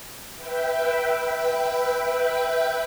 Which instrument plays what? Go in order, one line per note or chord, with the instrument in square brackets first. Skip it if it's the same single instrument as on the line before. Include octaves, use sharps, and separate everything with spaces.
[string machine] B4 E5 G5